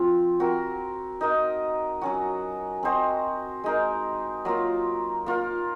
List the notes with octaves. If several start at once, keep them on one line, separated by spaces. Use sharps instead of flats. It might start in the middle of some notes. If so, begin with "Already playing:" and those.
Already playing: F3 C4 F4
C4 F#4 A#4
D#4 A#4 D#5
F#3 C#4 F#4
C4 F#4 C5 D#5
G#3 D#4 A#4
F#3 A#3 F4
A#3 F4 A#4